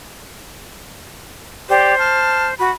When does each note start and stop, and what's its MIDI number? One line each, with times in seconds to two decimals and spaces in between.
1.69 1.97 67
1.69 2.54 72
1.69 1.97 74
1.98 2.48 81
1.98 2.48 89
2.58 2.70 66
2.58 2.70 83